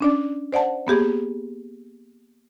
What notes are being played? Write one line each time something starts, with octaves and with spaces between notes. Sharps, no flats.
C#4 D4 D5
C5 D5 F#5 A5
A#3 B3 G4 G#4